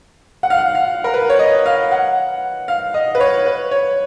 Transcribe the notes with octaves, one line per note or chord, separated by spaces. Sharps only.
F#5
F5
F#5
F5
A#4
B4
C#5
D#5
F5
F#5
F5
D#5
B4
C#5
B4
C#5